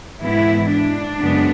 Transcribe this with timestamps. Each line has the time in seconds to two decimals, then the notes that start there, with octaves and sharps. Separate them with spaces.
0.21 G#2 E3 B3 E4
0.70 D4
1.20 F#2 C#3 G#3 B3